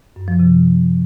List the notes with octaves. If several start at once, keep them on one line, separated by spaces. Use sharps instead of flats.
F#2
F3
C3